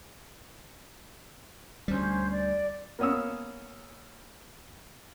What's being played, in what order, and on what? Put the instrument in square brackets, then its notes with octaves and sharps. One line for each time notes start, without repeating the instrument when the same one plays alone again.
[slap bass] D2 G3 [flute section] C#4 C5
[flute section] D5
[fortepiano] A#3 B3 C#4 D#6 E6